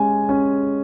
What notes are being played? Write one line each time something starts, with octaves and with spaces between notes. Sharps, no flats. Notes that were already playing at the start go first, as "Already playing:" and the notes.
Already playing: G#3 C#4 G#5
C#4